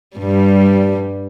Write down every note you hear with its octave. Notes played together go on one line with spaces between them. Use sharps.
G2 G3